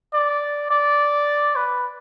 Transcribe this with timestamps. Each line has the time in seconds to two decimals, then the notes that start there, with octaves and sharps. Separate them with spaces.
0.14 D5
0.70 D5
1.56 B4